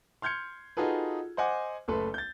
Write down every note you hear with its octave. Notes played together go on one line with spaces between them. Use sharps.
C6 F6 G6 G#6 C#7
D#4 F4 F#4 G#4 A4 B4
C5 D#5 F#5 G#5 D6
F#1 A3 A4 B4 C6
G6 A6